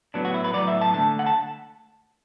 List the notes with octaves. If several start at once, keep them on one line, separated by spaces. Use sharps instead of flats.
A2 F#3 B3 D4
F#4
E4
B4
A2 F#3 B3 D5
E5
A5
D3 A3 A5
F#5
A5